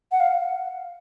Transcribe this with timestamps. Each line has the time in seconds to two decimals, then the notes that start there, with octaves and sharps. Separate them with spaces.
0.12 F#5
0.20 F5